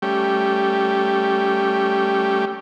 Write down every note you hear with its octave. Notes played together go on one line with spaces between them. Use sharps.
G3 A3 C#4 G4